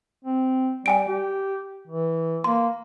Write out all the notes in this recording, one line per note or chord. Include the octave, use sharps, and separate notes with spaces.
C4
G3 G5 G#5 D7
G4
E3
A#3 C6